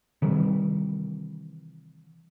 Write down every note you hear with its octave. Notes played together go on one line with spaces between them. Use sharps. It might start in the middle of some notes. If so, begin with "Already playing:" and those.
C3 D#3 E3 G3